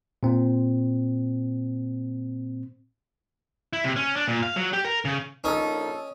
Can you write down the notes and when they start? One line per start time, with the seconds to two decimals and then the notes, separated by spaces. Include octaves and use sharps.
0.23 A#2 C4
3.73 E4
3.84 C3
3.96 C#4
4.16 D4
4.28 A#2
4.43 F5
4.56 F#3
4.73 G4
4.85 A#4
5.05 C#3
5.44 A#1 C#4 D#4 A4 A#4 D#5 F6